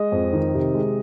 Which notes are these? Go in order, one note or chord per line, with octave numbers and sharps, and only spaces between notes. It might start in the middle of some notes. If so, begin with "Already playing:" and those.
Already playing: G#3 D#5
F2
D#3
C3
G#3